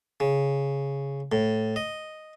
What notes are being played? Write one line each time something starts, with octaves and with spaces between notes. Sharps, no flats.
C#3
A2
D#5